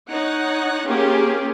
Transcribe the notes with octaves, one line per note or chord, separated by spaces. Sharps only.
D#4 C#5 F#5
A#3 C#4 F4 G4 G#4